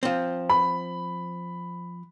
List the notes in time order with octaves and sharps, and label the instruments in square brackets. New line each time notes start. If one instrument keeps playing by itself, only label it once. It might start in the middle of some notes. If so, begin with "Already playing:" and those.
[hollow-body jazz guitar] F3 C4
[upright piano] B5